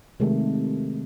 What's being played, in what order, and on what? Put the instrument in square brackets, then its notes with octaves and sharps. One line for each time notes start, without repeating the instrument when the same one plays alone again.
[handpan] C3 D#3 G#3 A3